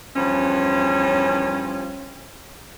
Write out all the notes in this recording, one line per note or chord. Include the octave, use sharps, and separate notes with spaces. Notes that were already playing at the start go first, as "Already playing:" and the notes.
E2 G2 F3 C#4